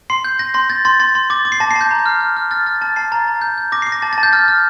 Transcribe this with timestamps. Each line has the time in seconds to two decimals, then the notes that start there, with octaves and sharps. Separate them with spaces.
0.10 C6 C7
0.24 G6
0.39 G6 A#6
0.54 C6 A#6
0.69 G6 A6
0.85 C6 A6
1.00 C6 A6
1.15 C6
1.30 D6 A6
1.45 D6
1.52 C7
1.60 A5 A#6
1.71 C7
1.76 A5
1.81 G6
1.91 A#5
2.06 F6
2.21 F6
2.37 F6
2.51 F6 A6
2.66 F6 A6
2.81 A5 A6
2.96 A5 C7
3.12 A#5 A6
3.27 A#5
3.41 G6
3.58 G6
3.72 D6 A#6
3.82 D6 C7
3.92 A#6
4.02 A5 A6
4.13 A5 A6
4.23 G6
4.33 F6 A6
4.48 F6